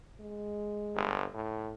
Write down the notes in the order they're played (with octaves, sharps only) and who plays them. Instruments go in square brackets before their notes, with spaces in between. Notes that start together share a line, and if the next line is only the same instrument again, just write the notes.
[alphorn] G#3
[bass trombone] G1
A2